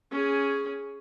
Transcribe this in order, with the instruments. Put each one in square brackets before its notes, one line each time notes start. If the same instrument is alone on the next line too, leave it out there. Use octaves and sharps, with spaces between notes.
[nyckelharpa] C#4 G#4